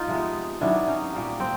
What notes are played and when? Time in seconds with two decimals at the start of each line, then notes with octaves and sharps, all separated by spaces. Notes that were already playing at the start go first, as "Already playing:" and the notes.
Already playing: D#4 F4
0.08 C3 F3 G#3 B3
0.61 C3 D#3 F#3 B3 D4 E4
0.87 C#4 D#4
1.13 A#2 G3 A#3
1.40 C4